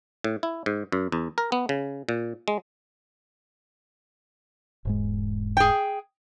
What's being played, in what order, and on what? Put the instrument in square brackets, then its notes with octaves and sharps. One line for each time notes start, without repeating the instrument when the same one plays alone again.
[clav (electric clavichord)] A2
E4
G#2
F#2
E2
A#4
B3
C#3
A#2
G#3
[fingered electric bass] E1 G#2 G#3
[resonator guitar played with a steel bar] G#4 G5